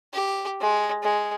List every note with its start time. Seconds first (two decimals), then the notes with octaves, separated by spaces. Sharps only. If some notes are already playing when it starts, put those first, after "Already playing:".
0.13 G4
0.61 G#3
1.03 G#3